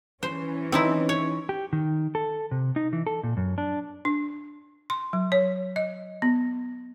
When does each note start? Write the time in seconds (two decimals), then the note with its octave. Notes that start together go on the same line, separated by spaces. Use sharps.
0.23 E3 C#4 C5
0.72 C4 D#4 E4
1.09 C#5
1.49 G4
1.73 D#3
2.15 A4
2.51 C3
2.76 D#4
2.93 E3
3.07 A4
3.23 A#2
3.37 F#2
3.58 D4
4.05 D4
4.90 C6
5.13 F#3
5.32 C#5
5.76 D#5
6.22 B3